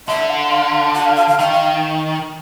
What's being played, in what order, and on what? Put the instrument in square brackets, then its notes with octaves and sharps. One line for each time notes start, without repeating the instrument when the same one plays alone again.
[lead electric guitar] D3 [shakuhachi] E5
[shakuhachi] F#5
F5
F#5
F5
F#5
F#5
F5
F5
F5
[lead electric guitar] D#3 [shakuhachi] F5
[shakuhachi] F5